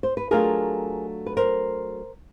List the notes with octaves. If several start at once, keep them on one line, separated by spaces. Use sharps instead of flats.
C5
B4
F#3 A3 D4 F4 G#4 A#4
B4
A#4 C5